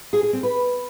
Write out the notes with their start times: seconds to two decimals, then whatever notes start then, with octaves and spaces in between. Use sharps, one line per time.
0.13 G#4
0.23 G#4
0.33 C4
0.43 B4